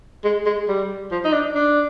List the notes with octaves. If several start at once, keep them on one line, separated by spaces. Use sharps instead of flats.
G#3
G#3
G3
F3
D#4
D4
D4